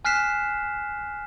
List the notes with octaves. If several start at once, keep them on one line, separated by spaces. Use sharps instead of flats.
G#5 F6 F#6 B6 C7 E7